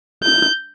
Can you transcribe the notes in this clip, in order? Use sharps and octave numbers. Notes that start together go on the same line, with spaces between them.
G6